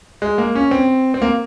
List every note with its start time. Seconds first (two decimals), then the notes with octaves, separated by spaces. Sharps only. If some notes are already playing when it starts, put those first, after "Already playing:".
0.22 G#3
0.38 A#3
0.55 C#4
0.71 C4
1.14 C4
1.22 A#3